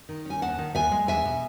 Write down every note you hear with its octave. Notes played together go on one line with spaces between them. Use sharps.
D#3
C#4 G#5
D#2 F#5 A5
D#3
D#2 E5 G#5
G#3
E2 E5 G#5
B2